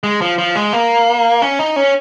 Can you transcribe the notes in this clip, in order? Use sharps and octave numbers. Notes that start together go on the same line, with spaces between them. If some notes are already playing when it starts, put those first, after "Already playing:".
G#3
F3
F3
G#3
A#3
C#4
D#4
C#4